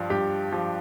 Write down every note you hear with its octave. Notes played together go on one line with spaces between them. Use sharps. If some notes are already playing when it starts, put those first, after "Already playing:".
Already playing: G2 F3
G2 G4
F3